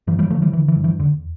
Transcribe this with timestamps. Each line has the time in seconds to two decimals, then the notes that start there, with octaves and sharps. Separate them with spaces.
0.07 G2 E3
0.19 E3 G3
0.30 D3 F3 A3
0.42 E3 G3
0.53 D3 E3
0.68 E3
0.76 G2
0.84 E3
0.99 E2 D3